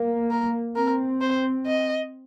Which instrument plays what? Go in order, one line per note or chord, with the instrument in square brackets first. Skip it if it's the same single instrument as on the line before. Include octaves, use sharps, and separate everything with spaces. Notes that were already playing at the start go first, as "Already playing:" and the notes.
Already playing: [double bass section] A#3
[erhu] A#4
[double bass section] C4 [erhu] A#4
[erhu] C5
D#5